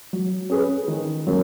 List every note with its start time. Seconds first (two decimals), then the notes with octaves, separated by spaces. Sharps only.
0.13 F#3
0.50 C#4 G#4 B4
0.88 D#3
1.27 F#3 A#3 C#4